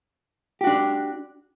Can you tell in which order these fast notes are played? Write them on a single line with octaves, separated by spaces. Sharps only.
G4 F#4 D4